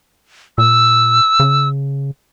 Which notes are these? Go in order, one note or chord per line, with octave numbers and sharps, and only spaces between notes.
A#2 E6
C#3